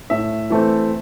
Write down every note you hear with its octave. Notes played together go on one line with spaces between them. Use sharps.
A2 E5
E3 A3 C4